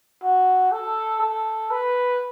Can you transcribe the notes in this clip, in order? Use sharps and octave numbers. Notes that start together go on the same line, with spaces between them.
F#4
A4
A4
B4